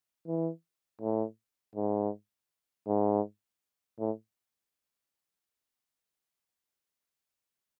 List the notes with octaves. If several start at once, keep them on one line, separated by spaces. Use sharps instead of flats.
E3
A2
G#2
G#2
A2